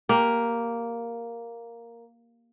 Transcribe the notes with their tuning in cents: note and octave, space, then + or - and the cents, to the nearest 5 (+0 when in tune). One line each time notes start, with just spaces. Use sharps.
A#3 +0 G4 +0